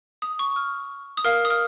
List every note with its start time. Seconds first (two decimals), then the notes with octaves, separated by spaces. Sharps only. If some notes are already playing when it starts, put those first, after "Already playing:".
0.22 D#6
0.39 C#6
0.56 F6
1.17 D#6
1.24 A#4 F5 F6
1.45 D#6
1.50 F6